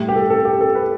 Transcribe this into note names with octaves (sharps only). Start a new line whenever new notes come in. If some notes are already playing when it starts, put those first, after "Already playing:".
Already playing: A2 G3
G4
A4
A4
G4
A4
B4